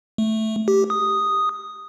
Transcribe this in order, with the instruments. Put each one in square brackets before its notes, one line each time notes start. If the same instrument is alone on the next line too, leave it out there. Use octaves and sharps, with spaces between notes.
[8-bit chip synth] A3
G4
D#6